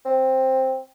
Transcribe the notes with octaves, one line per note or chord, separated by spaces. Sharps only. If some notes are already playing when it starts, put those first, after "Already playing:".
C4